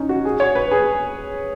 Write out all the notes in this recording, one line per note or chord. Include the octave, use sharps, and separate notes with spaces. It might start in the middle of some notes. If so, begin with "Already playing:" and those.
Already playing: C#4 D#4
F#4
G#4
C#5
B4
G#4